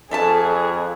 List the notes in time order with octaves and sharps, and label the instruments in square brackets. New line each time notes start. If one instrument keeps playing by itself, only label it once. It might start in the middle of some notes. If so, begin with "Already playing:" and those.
[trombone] F2 [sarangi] G#4 [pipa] A4 E5 A5